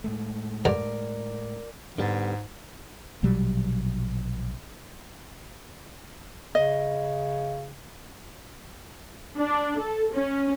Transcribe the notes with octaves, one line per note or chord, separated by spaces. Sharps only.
A2 G#3 A3
G2 D3 A#4 D5
G#2 D3 G3 B3
A#1 B2 F#3 G3
C#3 D#5
D4
A4
C#4